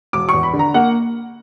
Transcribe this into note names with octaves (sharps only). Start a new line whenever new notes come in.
E1 D6
E2 C#6
B5
D3
A#5
A#3 F#5